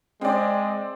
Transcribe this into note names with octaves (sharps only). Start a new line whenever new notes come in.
G#3 C4 D5